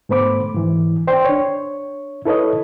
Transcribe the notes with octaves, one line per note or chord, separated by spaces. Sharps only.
G#2 A3 B3 C5 B5 D6
G#2 E3
C5 D5 G5 C6
D4 C#5
E4 A4 B4 C#5 D#5